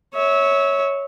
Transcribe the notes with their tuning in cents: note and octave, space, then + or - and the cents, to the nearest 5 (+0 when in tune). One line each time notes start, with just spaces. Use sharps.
C#5 +0 E5 -25